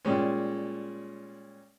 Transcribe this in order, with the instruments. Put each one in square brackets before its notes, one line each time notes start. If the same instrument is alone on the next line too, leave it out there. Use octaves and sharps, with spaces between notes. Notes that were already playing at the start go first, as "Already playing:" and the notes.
[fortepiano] A#2 G3 G#3 C#4